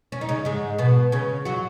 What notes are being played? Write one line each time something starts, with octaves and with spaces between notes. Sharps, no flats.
C#4
D#4
C#3 C#4
G#2 G#3
B2 B3
C#3 C#4
F#3 F#4